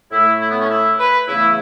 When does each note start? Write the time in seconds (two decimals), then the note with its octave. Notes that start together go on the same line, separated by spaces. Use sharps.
0.11 A2 A3 E4
0.40 E4
0.49 B3
0.60 C#4
0.70 E4
0.98 B4
1.27 E2 C#3 E3 A3 E4